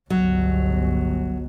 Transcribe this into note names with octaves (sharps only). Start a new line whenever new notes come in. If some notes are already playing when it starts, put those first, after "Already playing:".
G1 C#2 F#3